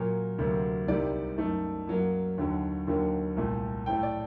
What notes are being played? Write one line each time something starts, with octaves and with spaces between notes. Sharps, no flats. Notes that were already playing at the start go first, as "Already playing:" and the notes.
Already playing: A#2 F#3 A#3 A#4
D2 C3 F#3 A#3
C2 C3 D#3 G3 A#3 D5
F#2 D#3 A3
F#2 F#3 A#3
D#2 D3 F#3
D#2 D3 F#3 A#3
C2 A#2 A3
A2 A3 G5
D5